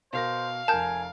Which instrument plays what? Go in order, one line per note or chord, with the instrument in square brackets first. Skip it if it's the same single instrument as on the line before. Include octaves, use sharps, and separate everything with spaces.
[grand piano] B2 A#4 A#6 [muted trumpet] C5 [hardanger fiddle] F5
[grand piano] F1 A#4 [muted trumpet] G#5 [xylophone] A5 G6